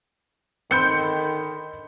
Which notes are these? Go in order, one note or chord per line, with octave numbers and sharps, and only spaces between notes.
D3 D#3 C4 B5 G6 C#7